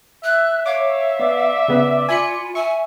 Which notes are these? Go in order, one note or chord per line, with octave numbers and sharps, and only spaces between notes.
E5 F#6
C#5 F5 D6
B3 D5
C#3 B3
F4 G#5 B5 C#7
E5 G#5 C#6